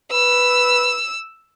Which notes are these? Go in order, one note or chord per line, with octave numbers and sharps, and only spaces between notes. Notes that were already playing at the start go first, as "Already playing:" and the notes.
B4 E6